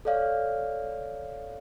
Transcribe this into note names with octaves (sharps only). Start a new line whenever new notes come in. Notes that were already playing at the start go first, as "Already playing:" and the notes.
A4 C#5 D5 F5